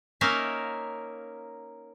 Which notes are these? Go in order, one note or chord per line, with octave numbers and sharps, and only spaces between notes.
A#3 C#4 D#4 A#4 E5 F5